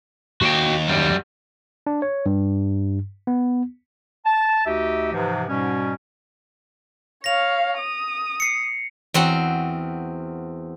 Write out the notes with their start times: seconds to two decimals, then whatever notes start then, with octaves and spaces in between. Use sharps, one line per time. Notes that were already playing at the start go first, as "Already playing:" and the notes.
0.42 D#2 F#4 G5
0.89 F#2 G3
1.87 D4
2.02 C#5
2.26 G2
3.27 B3
4.25 A5
4.65 D2 D#4 F#4 G4 D#5 E5
5.12 G#2 C3 E3 F3
5.49 G#2 B2 G3 C#4
7.24 C#5 F5 A#6 F7
7.78 D#6
8.40 C7 C#7
9.14 E2 C4 F#4 F#5